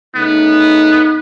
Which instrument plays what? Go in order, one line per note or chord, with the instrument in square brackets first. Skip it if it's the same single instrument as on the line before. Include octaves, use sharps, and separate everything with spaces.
[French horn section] C#3 A3 D#4 [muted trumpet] B3